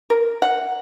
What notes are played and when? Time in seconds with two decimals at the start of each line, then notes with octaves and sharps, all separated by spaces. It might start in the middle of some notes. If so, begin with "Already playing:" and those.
0.10 A#4
0.42 F#5